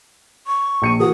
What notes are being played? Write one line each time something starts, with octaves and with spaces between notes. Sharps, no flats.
C#6
A#1 C#7 D#7
E3 A#3 F#4 D#6